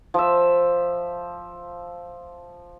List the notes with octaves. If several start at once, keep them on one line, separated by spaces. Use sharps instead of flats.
F3 E5